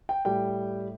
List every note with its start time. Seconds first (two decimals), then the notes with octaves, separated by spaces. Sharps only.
0.09 G5
0.25 A2 G3 G5